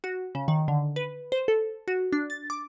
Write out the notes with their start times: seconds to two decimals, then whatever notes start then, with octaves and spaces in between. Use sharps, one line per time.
0.04 F#4
0.35 C#3
0.48 D#3
0.68 D3
0.96 B4
1.32 C5
1.48 A4
1.88 F#4
2.12 D4
2.30 A6
2.50 D6